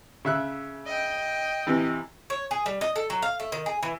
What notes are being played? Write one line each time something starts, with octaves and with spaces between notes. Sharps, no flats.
C#3 E5 F#6
D#5 G5
C3 E3
C#5
G#4
G3
D#5
A4
F#3
F5
A3
D#3
G#4
E3